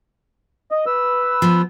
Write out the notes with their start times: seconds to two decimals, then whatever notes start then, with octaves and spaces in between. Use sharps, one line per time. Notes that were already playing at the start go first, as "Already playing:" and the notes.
0.71 D#5
0.86 B4 E6
1.42 F3 B3